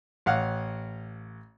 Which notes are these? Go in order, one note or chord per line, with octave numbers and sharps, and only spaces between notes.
A1 F5 F#5 F6